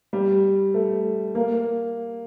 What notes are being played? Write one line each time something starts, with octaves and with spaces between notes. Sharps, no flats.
G3
A3
A#3